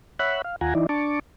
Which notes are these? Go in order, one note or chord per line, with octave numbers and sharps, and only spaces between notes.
C#5 E5 F#5 B5 F#6
F5
D#2 F4 F#5 G#5 A#5
E3 D#4 E4 D5
D4 A5 C#6 D6